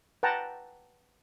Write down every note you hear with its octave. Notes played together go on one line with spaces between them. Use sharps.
B4 F#5 G5 A5 A#5